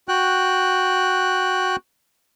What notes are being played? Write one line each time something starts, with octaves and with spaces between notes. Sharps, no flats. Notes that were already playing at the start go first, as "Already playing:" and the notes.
F#4 G5 F#6